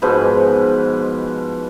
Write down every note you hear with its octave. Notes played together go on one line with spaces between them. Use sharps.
G#2 B2 F3 B4